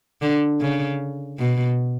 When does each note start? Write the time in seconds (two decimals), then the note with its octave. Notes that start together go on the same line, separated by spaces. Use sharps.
0.22 D3
0.61 C#3
1.39 B2